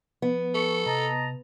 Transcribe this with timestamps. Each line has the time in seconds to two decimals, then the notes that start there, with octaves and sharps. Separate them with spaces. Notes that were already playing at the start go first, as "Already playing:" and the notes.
0.22 F3 B3
0.54 A4 C#6
0.86 C3 D#5 A5 A#5